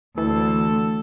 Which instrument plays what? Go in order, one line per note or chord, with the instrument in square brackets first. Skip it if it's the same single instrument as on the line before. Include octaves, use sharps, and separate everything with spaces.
[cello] D2 [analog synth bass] E3 [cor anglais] A4